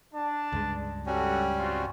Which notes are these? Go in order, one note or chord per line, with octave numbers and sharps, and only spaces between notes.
D4 A5
C#2 G2 G#3
G3 C#4 F#4 A4
C4 F4 F#4